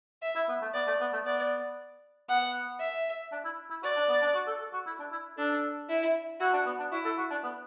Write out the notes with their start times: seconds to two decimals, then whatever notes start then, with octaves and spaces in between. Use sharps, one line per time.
0.23 E5
0.36 E4
0.49 B3
0.62 A3
0.74 B3 D5
0.87 A3
1.00 B3
1.13 A3
1.26 B3 D5
2.29 B3 F#5
2.80 E5
3.32 D4
3.45 E4
3.71 E4
3.83 F#4 D5
3.96 D4
4.09 B3
4.22 D4
4.35 F#4
4.48 A4
4.61 A4
4.73 F#4
4.87 E4
5.00 D4
5.12 E4
5.38 D4 A4
5.89 E4
6.41 E4 F#4
6.53 D4
6.66 B3
6.79 D4
6.92 E4 F#4
7.05 A4
7.18 F#4
7.31 D4
7.44 B3